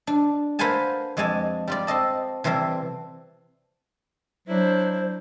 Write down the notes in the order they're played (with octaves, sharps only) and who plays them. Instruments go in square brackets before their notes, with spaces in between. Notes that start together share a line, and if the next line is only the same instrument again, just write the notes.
[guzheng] D4
A#3 B4 C5 F#5 G#5 A5
F2 G#3 D5 G#5 A5
G3 F4 D5
C4 A4 D#5 A5
C3 E3 G3 C4 A4
[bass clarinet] F#3 [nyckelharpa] D4 E4 [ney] C5